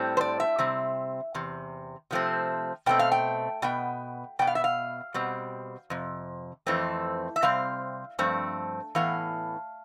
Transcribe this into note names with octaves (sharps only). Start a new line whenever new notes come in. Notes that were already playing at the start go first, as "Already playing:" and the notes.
Already playing: A2 G3 C4
C5
D5
E5
C3 G3 C4
E2 C3
C3 F3 A3 C4
B2 A3 C4 G5
F5
G5
B2 B3 G5
B2 B3 G5
F5
E5
F5
B2 G3 C4
F2 C3
F2 E3 A3 C4
E5
C3 G3 C4 F5
G2 F3 A3 C4
A2 E3 B3 F5